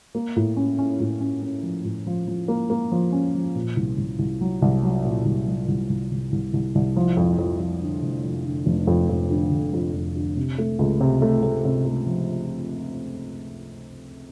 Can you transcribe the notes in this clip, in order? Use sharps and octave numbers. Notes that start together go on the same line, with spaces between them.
A#3
A2
C#4
C#4
A2
C#4
C#4
F3
A2
F3
F3
A#3
A#3
F3
C#4
F3
A#2
C2
C2
C2
F#3
C2
F#3
A#2
C2
F#3
C2
C2
C2
C2
C2
C2
F3
F2
F2
F2
D3
F1
F3
D3
F1
F2
F2
D3
F1
F2
F2
D3
C3
A3
C#2
C3
A3
A3
C3
A3
F3